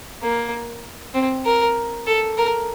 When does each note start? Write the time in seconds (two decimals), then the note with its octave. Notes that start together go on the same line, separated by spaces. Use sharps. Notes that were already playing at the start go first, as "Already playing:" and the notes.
0.22 A#3
1.14 C4
1.45 A#4
2.07 A4
2.37 A#4